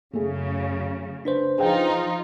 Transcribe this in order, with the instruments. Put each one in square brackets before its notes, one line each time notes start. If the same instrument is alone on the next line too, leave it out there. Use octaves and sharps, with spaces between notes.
[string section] F#2 C#3 [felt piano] A3 G#4
[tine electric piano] D4 B4 C5
[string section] F3 D#4 F4 [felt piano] G#4 F5 G5